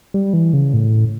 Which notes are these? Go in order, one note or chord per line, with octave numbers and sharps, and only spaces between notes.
G3
E3
C#3
A2